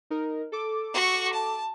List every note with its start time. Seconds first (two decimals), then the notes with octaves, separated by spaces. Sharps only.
0.10 D#4 A#4
0.52 A4 D6
0.94 F#4 C#6
1.33 A5